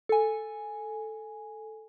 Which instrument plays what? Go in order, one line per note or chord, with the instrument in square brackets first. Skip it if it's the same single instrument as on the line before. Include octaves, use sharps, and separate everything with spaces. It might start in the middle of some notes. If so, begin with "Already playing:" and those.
[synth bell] A4 G#5